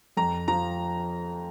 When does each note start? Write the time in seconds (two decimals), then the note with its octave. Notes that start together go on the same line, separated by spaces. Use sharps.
0.17 F2 A#5
0.48 F3 A#5